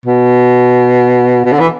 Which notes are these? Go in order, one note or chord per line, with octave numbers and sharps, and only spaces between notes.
B2
B2
D3
E3